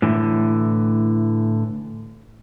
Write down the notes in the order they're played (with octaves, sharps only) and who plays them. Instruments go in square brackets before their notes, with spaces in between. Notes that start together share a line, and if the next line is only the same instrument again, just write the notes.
[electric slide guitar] A2 D3 E3